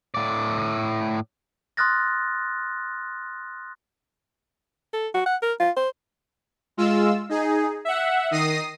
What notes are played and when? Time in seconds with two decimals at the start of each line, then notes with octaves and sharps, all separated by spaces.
0.14 A2 D5
1.77 C6 D#6 F6 F#6 A6 A#6
4.93 A4
5.14 F#4
5.26 F#5
5.42 A#4
5.60 F4
5.76 C5
6.77 G#3 F4 E6
7.29 D#4 G#4
7.85 E5 F#5
8.31 D#3 D#6 A#6 C7 D#7